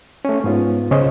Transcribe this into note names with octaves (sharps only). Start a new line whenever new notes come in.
A3 C#4
G#2 B3 F4
C2 C#3 C#4 C5 D#5